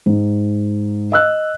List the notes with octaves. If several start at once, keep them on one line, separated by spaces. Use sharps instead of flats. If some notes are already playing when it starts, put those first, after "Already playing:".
G#2
D#5 E6 F#6